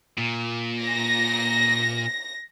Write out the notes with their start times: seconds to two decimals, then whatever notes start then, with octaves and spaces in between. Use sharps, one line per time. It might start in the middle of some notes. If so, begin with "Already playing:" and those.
0.18 A#2
0.82 A#6